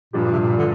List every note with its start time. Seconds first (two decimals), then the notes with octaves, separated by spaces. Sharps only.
0.13 G2 A#2 F3 D4 G4
0.32 C3
0.39 A#2
0.57 D3